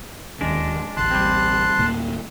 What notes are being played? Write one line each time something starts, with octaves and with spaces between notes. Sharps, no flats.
D1 D#2 G#3 C#4 D4
A1 D2 A5 C6 F#6
G3 C4
D2 A2 A#3